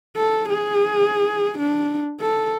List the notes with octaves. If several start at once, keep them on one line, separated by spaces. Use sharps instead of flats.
A4
G#4
D4
A4